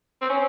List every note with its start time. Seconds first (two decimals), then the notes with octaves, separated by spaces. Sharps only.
0.22 C4
0.29 C#4